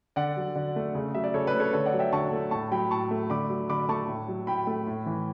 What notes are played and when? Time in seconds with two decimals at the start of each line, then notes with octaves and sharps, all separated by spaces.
0.16 D3 D5 F#5
0.37 F#3
0.55 D3
0.76 A3
0.95 C#3
1.14 F#3 E5
1.24 D5
1.34 C#3 A4 C#5
1.47 B4 D5
1.54 A3
1.60 A4 C#5
1.73 D3 A4 C#5
1.86 D5 F#5
1.93 F#3
1.99 E5 G5
2.13 D3 A5 C#6
2.32 A3
2.51 A2 A5 C#6
2.72 F#3 G5 B5
2.90 A2 A5 C#6
3.11 A3
3.30 D3 B5 D6
3.50 F#3
3.70 D3 B5 D6
3.89 A3 A5 C#6
4.08 A2
4.28 F#3
4.47 A2 G5 B5
4.67 A3
4.87 A2
5.06 E3